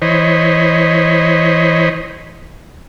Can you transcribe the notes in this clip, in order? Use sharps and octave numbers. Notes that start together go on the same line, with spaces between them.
E3 C5 C#5 D#5 B5